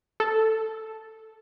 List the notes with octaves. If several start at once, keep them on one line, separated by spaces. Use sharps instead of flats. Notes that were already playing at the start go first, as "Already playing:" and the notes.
A4